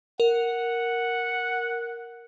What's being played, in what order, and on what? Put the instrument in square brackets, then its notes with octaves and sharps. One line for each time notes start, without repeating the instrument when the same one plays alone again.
[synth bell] A#4 [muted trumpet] F#5